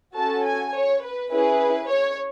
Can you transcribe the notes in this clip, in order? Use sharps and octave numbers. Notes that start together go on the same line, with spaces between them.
C#4 F#4 A4 A5
G#5
C#5
B4
C#4 E4 G#4 B4
C#5